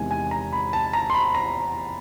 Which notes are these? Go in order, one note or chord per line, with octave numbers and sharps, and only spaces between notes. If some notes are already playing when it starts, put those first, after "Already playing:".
Already playing: E2 C3 D#3 G#3 G#5
G#5
A#5
B5
A5
A#5
C6
B5
A#5